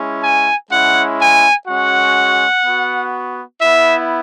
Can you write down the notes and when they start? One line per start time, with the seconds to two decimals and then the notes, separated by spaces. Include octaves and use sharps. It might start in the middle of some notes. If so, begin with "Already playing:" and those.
Already playing: G#3 C#4 E4
0.21 G#5
0.70 G#3 C#4 E4 F#5
1.19 G#5
1.67 G#3 C#4 F#4 F#5
2.65 B3 F#4
3.61 B3 E4 E5